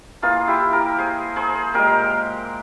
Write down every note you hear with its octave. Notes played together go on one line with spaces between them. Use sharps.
E3 A#3 F4 G#4
E4 G4
G4 A#4
G#4 C5
G#4 C5
A#2 G#3 G4 A#4